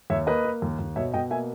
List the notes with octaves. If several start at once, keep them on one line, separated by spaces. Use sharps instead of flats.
D#2 C#5 E5
A#3 B4 D#5
A#3
D#2
D#2
B2 C#5 E5
B2 D#5 G5
A#3 E5 G#5